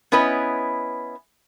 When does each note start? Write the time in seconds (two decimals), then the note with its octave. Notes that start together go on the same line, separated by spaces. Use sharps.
0.12 B3 C#4 E4 B4 D#5